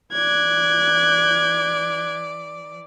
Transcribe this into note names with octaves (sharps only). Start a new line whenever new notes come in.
E3 D5 F#6 G#6